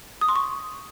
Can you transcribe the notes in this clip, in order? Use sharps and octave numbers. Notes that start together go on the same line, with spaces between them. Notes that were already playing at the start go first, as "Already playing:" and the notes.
D#6
C6
C#6